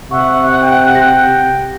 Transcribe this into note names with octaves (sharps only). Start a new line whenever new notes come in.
C3 E5 F#5 C#6
G5
G4 A#6